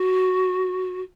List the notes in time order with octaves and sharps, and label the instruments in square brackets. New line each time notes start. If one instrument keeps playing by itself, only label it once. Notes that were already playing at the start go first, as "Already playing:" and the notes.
Already playing: [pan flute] F#4